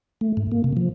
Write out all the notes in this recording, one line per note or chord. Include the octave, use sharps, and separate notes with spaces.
A3
G#2
A#3
C3
F3